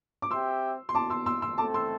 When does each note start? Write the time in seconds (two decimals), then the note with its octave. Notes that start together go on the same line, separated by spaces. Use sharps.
0.22 D6
0.31 C4 G4 E5 G5 C6 E6
0.89 C6
0.95 A5 D6
1.10 C6 E6
1.26 C6 E6
1.42 C6 E6
1.58 A3 C4 A4 A5 D6
1.74 C6 E6